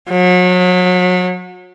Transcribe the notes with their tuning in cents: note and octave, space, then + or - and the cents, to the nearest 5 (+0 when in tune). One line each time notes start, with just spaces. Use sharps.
F#3 -35